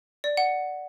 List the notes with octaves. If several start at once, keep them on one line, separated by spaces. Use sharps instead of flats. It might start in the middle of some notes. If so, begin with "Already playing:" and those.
D5
F#5